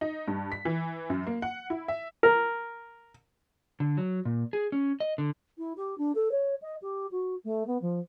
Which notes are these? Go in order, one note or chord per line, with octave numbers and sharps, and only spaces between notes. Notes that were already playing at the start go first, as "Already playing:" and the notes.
D#4
G2
B6
E3
F#2
A#3
F#5
E4
E5
A#4
D3
F#3
A#2
G#4
C#4
D#5
D3
E4
G4
D4
A4
C#5
D#5
G4
F#4
A3
B3
F3